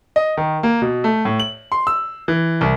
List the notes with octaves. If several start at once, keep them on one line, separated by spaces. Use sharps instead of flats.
D#5
D#3
A#3
B2
A3
A2
F#7
C6
E6
E3
C2